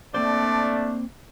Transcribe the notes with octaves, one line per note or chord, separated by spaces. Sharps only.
A3 A#3 C4 D4 C5 D5